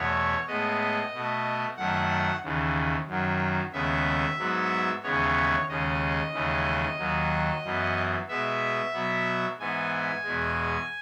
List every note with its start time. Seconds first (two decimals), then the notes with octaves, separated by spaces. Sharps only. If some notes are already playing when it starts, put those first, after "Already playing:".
Already playing: E2 B2 A3 C#5
0.47 A2 G#3 B3 D#5
1.13 B2 A3
1.77 F#2 D#3 A3 F#5
2.43 D#2 C#3 E3
3.08 F#2 D#3 F#3
3.73 D#2 C#3 G#3 B3 E5
4.39 G#2 F#3 B3
5.03 D#2 C#3 E3 G#3 B3 C#5
5.68 D#2 C#3 G#3 D#5
6.33 D#2 C#3 E3 G#3
6.98 D#2 D#3 F#3
7.64 F#2 E3 B3
8.28 B2 G#3 B3 E5
8.93 B2 F#3 B3
9.59 G#2 E3 B3 G#5
10.24 E2 B2 G#3